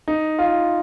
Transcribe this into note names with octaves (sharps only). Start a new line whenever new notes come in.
D#4
F4